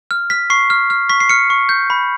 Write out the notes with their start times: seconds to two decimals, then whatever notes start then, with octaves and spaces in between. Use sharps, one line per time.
0.11 F6
0.30 F6 B6
0.50 C#6 C7
0.70 F6
0.90 F6
1.09 C#6 B6
1.20 C7
1.29 F6 C#7
1.50 C#6
1.69 G6
1.90 B5